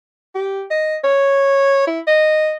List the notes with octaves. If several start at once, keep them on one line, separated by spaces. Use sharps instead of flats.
G4
D#5
C#5
E4
D#5